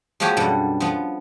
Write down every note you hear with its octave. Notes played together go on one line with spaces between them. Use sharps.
F3 G#3 A#3 F#4 G4 C#5
F#2 B2 D3 G3
F3 B3